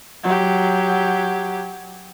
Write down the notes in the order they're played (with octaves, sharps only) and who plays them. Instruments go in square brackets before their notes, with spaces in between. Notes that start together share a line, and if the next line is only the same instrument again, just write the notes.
[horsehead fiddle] F#3 G4